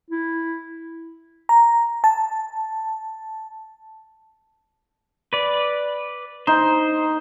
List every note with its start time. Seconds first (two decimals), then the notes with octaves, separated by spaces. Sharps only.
0.11 E4
1.49 A#5
2.04 A5
5.33 B4 D5
6.47 D#4 C5